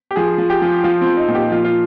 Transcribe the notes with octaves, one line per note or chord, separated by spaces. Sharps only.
G4
F3 G#4
F3
G4
F3
F3 F4
F3 C4
D#4
A#2
G4
F3 F4
F4